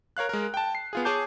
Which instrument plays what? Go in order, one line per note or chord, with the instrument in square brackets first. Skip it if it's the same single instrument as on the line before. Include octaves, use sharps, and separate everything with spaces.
[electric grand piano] A#4 C#5 F5 F#6
G#3 A#4
G5 A5
C7
B3 F4 G#4
G#4 C#5 G#5 A5 D6 G6